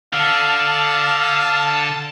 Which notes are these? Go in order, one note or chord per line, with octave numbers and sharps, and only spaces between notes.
D3 F5 A5